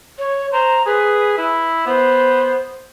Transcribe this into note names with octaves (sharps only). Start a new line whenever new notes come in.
C#5
C5 A#5
G#4 B4
E4
B3 C5